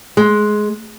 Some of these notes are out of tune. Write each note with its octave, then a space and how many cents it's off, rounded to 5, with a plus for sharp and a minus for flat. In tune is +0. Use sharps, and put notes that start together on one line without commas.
G#3 +15